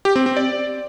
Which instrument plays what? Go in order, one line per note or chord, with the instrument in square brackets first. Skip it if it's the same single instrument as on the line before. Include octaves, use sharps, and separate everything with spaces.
[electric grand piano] G4
C4
C4
D5